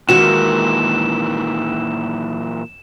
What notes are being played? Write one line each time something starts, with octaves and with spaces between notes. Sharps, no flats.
A#2 D#3 E3 G#3 A#3 F#4 E7